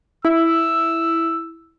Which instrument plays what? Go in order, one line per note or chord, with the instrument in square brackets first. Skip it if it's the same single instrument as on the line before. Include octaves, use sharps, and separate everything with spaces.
[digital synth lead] E4 [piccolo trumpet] E6